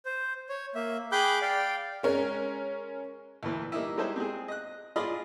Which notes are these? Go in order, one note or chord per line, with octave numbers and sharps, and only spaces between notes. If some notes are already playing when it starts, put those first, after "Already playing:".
C5
C#5
A#3 E5
G#4 G5 B5 D6 F#6 G6
D5 F5 G5
G#3 C#4 A#4
D2 A#2 E3
G3 A#3 D#4 E4
G3 G#3 D#4 E4 C5
C4 G#4
D#5 F#6
F4 G#4 D5 D#5 B5 C6